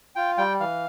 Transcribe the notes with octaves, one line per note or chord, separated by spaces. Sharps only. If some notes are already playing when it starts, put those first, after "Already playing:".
F4 G5
G3 G5
E3 F5